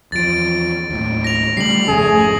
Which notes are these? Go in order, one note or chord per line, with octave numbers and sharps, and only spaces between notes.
E2 F3 A6 D7
D#2 A2
A#6 F7
C#3 G3 A3 C7 F#7
G#1 F2 C#3 A3 G#4